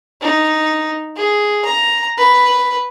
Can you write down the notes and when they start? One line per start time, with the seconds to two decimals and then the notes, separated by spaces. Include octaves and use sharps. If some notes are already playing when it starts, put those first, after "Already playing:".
0.22 D#4
1.17 G#4
1.65 A#5
2.17 B4